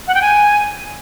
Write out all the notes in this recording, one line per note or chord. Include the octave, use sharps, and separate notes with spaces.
F#5
G5
G#5